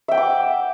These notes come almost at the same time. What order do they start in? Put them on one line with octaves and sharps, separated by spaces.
E5 G5 F#5 D6